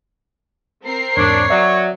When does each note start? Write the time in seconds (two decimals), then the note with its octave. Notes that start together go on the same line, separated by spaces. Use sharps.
0.84 C4 A#4 C7
1.17 E2 G#2 D4 C#5
1.50 F#3 D5 E5